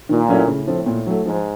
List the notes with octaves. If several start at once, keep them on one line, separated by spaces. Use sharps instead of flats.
A#2 D#3
F#3 A3 C#4 E4
A2 C#3
F3 A3 C4
A#2
F#3 A3
G#2 F3